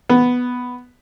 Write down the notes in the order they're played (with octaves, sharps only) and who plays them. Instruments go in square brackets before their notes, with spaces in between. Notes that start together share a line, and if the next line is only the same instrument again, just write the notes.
[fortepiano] B3